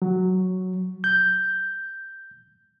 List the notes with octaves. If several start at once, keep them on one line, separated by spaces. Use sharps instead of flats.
F#3
G6